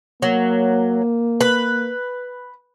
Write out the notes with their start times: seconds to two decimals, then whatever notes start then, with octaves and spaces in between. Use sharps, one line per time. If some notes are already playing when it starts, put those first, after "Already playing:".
0.22 F#3 A#3
1.41 B4